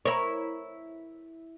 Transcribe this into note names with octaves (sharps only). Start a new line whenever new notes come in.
E4 A#4 C#5